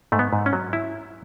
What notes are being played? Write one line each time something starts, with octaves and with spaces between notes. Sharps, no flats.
G#2 A3
B3
G#2
C#4
F#3
E4